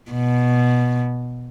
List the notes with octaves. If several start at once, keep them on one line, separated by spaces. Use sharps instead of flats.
B2